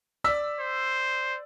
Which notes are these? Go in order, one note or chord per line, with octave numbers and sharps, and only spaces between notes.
D5 E6 B6
C5